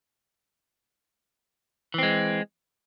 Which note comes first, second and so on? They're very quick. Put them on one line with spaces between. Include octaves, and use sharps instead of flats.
E3 C4 G#3